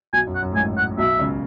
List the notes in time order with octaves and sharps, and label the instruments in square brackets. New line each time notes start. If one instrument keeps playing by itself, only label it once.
[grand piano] B1 B2 [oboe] G#5
[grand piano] F#2
[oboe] F#5
[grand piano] F#2
A2
[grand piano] G#1 G#2 [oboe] G#5
[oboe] F#5
[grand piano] B1 B2 [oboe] E5
[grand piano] C#2 C#3